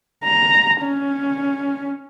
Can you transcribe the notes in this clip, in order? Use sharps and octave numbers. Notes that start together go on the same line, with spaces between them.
A#5
C#4